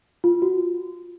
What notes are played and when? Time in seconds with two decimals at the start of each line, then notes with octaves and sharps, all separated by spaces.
0.24 F4
0.42 F#4